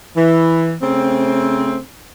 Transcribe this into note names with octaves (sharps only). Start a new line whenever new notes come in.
E3
C#3 A3 C4